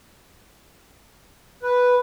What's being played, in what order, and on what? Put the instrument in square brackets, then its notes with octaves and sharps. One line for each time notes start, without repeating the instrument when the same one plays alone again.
[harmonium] B4